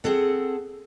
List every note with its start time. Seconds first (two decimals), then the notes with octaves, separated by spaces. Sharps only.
0.04 C4 G#4 A4 F#5